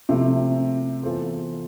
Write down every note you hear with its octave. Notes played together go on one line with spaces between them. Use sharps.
C3 F3 A3 C4 E4
E3 B3 F4 A4 C5